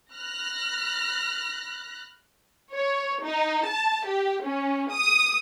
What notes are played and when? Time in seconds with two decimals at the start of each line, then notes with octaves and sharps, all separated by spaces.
0.13 B5 F6 F#6 A#6
2.74 C#5
3.24 D#4
3.66 A5
4.07 G4
4.44 C#4
4.91 D#6